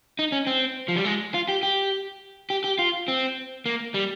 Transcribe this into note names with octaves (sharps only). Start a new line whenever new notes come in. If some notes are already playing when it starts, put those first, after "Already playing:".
D#4
C#4
C4
F3
G3
G#3
F4
G4
G4
G4
G4
F4
C4
A#3
G3